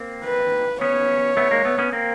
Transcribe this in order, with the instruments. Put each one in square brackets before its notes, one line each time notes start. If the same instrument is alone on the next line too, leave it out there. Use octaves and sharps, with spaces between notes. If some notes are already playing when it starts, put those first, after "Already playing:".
Already playing: [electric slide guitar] A#3 C4
[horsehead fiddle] B4
[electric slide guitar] B3 C#4 [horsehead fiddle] C#5
[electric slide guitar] A3 B3
G#3 A#3
A3 B3
B3 C#4
A#3 C4